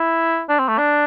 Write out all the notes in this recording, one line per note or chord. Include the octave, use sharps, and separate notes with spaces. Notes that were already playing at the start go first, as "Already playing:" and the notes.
Already playing: E4
D4
C4
A3
D4